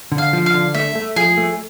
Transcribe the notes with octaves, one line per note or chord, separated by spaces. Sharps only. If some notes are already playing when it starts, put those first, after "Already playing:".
D3
F5
F3
F5
D3
A3 E5
A3
F3 G#4
A3